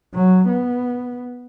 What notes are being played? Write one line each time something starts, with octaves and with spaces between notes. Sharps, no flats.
F#3
B3